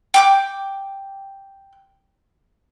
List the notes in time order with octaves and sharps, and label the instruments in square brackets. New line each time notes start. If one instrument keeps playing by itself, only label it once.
[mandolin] G5 D6 G6